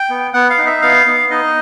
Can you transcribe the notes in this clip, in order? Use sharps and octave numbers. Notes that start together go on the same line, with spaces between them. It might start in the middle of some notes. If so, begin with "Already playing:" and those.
Already playing: G5
B3
B3 F#5
F5
D#4
E5
B3 F5
B3
D#4 D#5